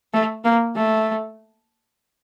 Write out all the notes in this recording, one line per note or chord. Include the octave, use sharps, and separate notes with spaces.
A3
A#3
A3